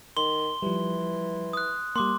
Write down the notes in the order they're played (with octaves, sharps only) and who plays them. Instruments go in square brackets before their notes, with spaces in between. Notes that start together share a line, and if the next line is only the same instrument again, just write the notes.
[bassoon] D#3 [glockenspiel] C6 G7
[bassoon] E3 [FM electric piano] F3 G3
[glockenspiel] D#6 F#6
[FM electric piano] G3 A#3 [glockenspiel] C6 D6